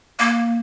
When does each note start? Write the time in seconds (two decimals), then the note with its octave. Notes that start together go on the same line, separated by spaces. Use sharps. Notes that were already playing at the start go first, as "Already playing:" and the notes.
0.19 A#3